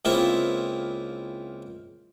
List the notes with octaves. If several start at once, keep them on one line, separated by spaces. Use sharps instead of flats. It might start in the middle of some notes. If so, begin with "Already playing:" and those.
C#2 A#3 C4 E4 F4 E5